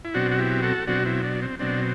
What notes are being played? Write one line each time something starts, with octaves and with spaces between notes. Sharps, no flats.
E4
B2 F#3 C4 D4 F#4
F#4
E4 G4
F#4 A4
B2 F#3 C4 D4 F#4
C4 E4
D4
C4
B2 F#3 C4 D4